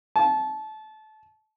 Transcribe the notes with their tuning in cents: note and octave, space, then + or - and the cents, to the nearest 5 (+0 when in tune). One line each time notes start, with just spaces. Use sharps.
A5 -25